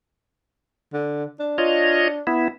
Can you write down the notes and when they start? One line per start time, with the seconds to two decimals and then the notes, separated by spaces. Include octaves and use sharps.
0.93 D3
1.39 D4
1.58 F4 C#5 D#5
2.27 B3 E4